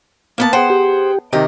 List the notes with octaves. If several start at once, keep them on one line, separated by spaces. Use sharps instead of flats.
A#3 B3 A5
G#4 C5 F#5 G5
G4
C3 D#3 G4 D#5